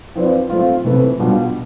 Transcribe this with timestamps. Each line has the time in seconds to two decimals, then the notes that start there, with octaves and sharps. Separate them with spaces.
0.15 F3 C4 F4 B4 D5
0.50 A3 C4 F4
0.84 C3 E3 A3 E4 B4
1.19 B2 G3 D4 F4